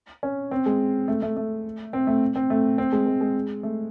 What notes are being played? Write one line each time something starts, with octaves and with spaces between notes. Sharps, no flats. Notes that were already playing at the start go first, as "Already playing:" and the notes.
C#4
C4
G#3
A3
A3
A3
C4
A3
C4
A3
C4
G#3
G#3
G#3
A3